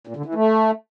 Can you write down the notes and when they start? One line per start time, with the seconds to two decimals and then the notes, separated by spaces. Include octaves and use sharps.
0.07 A#2
0.16 D3
0.26 E3
0.35 A3